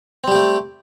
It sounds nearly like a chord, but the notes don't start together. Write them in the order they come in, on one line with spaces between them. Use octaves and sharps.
C4 G3 G4 A3